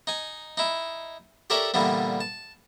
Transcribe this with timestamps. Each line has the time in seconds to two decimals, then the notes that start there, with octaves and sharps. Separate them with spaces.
0.07 D#4 G#5
0.57 D#4 E4
1.50 G4 A4 A#4 C#5 D5 E5
1.74 A#2 D3 E3 G3 B3
2.20 A5